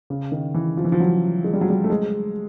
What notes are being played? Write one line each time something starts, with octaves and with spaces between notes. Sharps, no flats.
C#3
D#3
E3
F3
E3
F3
F#3
G#3
G3
F#3
G3
A3
G#3